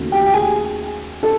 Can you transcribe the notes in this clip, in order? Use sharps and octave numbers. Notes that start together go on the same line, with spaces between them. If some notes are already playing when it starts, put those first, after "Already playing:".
Already playing: D#2 C#3 F#3 A3
G4 G5
G5
G#4 G#5
A4